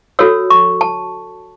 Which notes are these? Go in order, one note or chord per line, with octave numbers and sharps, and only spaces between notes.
F#4 A4 C#5 E6
C#6
A5